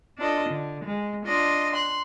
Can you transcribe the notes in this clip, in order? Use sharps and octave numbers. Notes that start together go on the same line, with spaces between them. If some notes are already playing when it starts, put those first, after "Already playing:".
D4 F4 A4 D#5
D3
G#3
D4 F4 D#5 C6
C6 F#6